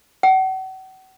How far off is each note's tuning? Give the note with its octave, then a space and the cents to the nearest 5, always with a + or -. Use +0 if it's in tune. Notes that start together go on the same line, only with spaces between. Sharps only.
F#5 +40